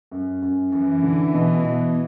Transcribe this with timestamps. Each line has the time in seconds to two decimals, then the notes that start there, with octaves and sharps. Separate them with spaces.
0.11 F#2
0.42 F#2
0.72 F#2 E3
1.03 D3
1.33 B2
1.64 B2